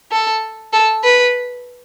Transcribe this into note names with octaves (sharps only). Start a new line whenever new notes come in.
A4
A4
B4